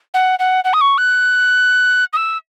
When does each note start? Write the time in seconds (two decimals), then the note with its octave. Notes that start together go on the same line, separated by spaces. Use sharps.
0.14 F#5
0.39 F#5
0.64 F#5
0.73 D#6
0.81 C#6
0.98 F#6
2.13 D#6
2.17 E6